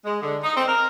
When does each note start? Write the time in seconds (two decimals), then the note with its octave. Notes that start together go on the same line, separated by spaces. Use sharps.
0.05 G#3
0.22 D3
0.43 D#4
0.56 C4
0.67 A#4